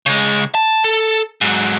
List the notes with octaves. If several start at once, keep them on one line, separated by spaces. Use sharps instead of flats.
C#3 G#3
A5
A4
G#2 F#3